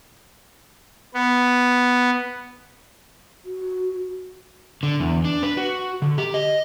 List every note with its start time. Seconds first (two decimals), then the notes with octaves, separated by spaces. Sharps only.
1.14 B3
3.45 F#4
4.83 D3
5.00 E2
5.25 D4
5.43 B4
5.57 F#4
6.02 D3
6.18 G4
6.34 D#5